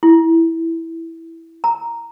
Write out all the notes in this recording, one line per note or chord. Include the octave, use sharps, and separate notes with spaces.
E4
A#5